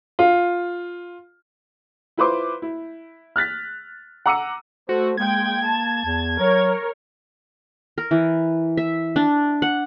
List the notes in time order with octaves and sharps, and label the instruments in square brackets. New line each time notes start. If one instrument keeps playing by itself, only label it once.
[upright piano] F4
E4 F4 B4 C5 C6 D6
E4
F6 F#6 A6 B6
F#5 A#5 D6 E6 C#7 D#7
[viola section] A3 [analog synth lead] F#4 [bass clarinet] C5
[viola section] G#3 G5 [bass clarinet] A#3 [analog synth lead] G#6
[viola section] A5
[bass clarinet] E2
[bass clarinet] F#3 [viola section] A#4 C#5
[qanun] A#4
E3
E5
D4
F#5